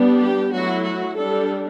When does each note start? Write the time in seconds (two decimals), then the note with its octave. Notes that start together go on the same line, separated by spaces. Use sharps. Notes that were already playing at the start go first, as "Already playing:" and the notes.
Already playing: G3 B3 D4
0.20 G4
0.51 F#3 A3 E4 F#4
0.84 F#4
1.16 G3 D4 A4